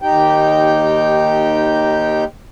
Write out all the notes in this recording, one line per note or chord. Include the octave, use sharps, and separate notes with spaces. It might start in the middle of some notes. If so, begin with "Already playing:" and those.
D#2 D#4 G4 G5